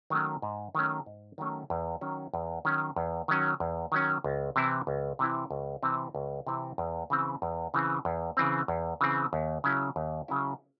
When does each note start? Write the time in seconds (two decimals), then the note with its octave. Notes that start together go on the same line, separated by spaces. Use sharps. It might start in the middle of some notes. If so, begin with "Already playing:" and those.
0.10 D#3 F#3 A3 C#4
0.42 G#2
0.75 D#3 F#3 A3 C#4
1.06 G#2
1.38 D#3 F#3 A3 C#4
1.70 E2
2.01 D#3 F#3 C#4
2.34 E2
2.65 D#3 F#3 C#4
2.96 E2
3.28 D#3 F#3 C#4
3.60 E2
3.92 D#3 F#3 C#4
4.24 C#2
4.56 C3 E3 C4 E4
4.87 C#2
5.19 C3 E3 C4 E4
5.51 C#2
5.83 C3 E3 C4 E4
6.15 C#2
6.47 C3 E3 C4 E4
6.78 E2
7.10 C#3 E3 C4
7.42 E2
7.74 C#3 E3 C4
8.05 E2
8.37 C#3 E3 C4
8.68 E2
9.01 C#3 E3 C4
9.33 D#2
9.64 C#3 F#3 C#4 E4
9.96 D#2
10.28 C#3 F#3 C#4 E4